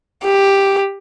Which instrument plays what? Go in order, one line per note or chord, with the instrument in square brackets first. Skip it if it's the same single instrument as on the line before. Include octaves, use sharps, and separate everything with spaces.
[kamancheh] G4